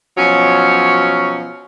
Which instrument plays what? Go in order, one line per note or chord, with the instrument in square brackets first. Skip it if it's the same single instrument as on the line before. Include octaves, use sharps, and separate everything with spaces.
[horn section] B2 F3 F#3 C#4